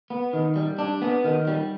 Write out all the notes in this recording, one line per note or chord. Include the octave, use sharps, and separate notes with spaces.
B3
D#3
G3
D4
B3
D#3
G3